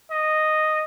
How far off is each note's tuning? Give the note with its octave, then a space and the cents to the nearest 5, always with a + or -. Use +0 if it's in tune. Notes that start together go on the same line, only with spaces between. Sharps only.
D#5 -5